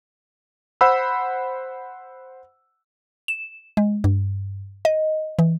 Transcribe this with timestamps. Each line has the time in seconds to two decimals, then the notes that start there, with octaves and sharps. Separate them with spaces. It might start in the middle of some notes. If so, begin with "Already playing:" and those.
0.81 C5 F#5 B5 E6
3.28 E7
3.77 G#3
4.04 G2
4.85 D#5
5.39 E3